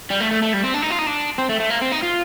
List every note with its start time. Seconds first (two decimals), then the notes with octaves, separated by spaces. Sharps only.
0.10 G3
0.20 A3
0.31 A3
0.42 A3
0.53 G3
0.64 C4
0.74 D4
0.82 D#4
0.90 F4
0.98 D#4
1.06 D4
1.38 C4
1.49 A3
1.60 A3
1.70 A#3
1.82 C4
1.92 D#4
2.03 F4